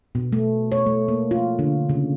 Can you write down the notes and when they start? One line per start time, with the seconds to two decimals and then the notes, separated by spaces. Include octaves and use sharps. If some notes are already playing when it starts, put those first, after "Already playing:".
0.15 B2
0.33 A3
0.72 C#5
0.86 A3
1.08 A#3
1.31 F4
1.59 D3
1.90 C#3